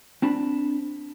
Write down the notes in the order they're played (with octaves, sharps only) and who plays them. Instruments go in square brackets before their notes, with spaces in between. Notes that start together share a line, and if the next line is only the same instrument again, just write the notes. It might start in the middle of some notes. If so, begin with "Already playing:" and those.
[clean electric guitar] C4 D4 A5 B5